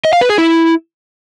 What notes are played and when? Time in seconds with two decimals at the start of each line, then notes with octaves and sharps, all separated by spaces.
0.05 D#5
0.13 F5
0.21 B4
0.30 G#4
0.38 E4